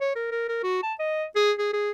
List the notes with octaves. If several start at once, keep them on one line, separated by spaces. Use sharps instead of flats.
C#5
A#4
A#4
A#4
F#4
A5
D#5
G#4
G#4
G#4